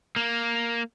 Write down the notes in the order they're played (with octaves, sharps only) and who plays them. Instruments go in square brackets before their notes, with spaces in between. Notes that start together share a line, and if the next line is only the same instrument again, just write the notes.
[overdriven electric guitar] A#3